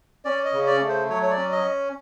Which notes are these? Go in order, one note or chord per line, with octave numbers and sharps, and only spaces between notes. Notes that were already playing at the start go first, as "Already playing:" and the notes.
C#4 D5
D#5
C#3
D5
A3
C5
F#3 C#5
C#5
D5
C#4
D#5